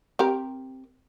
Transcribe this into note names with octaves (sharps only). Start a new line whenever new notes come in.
C4 G4 A#4